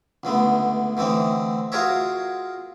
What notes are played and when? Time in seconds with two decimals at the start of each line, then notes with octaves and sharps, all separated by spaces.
0.23 C#2 D3 A3 B3
0.97 D3 E3 A3 C4 D#4
1.72 F4 F#4 G#4 A#4 C#5 E5